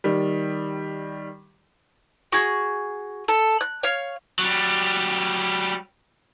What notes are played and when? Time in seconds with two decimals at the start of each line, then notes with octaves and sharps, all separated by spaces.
0.04 D#3 G3
2.32 F#4 G#4
3.28 A4
3.61 F#6
3.83 C#5 F5
4.39 F#3 G3